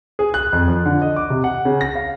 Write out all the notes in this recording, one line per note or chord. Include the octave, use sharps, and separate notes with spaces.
G#4
F#6
F2
F3
D3
D#5
D6
C3
F#5
C#3
A#6
F5